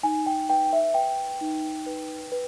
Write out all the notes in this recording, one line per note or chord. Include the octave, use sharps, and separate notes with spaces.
D#4 G#5
G5
B4 G5
E5
B4 G5
D#4
B4
B4